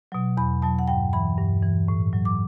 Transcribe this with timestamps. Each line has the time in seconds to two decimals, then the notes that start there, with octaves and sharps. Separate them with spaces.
0.12 B2 F#3
0.37 E2 B5
0.62 B2 F#3 A5
0.79 F#5
0.88 G2 G5
1.13 E3 B5
1.38 G2
1.63 E3
1.88 A2
2.13 F#3
2.25 D6